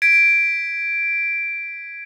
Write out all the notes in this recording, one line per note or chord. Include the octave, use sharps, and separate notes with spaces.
G#6 B6 D7